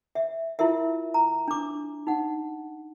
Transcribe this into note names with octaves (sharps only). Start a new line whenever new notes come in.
E5
E4 F4 A#4 E5
A#5
D4 D6
D#4 F#5